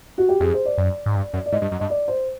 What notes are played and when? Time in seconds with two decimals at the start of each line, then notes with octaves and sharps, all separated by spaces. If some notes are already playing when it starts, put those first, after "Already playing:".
0.18 F#4
0.29 G4
0.40 F2 G#4
0.54 C5
0.65 D5
0.78 F#2
1.06 G#2
1.16 G2
1.33 F#2
1.46 D5
1.52 G#2 D#5
1.62 G2
1.72 F#2
1.80 G2 D#5
1.90 D5
2.08 C5